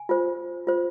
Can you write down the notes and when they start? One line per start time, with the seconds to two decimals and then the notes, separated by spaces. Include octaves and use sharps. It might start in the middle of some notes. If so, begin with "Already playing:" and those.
Already playing: G#5
0.09 F4 C5
0.67 F4 C5